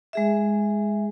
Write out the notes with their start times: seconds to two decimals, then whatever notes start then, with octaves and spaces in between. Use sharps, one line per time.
0.13 G#3 G#4 E5